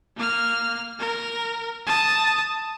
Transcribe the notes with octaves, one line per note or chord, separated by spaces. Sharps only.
A#3 F6
A#4
A5 D#6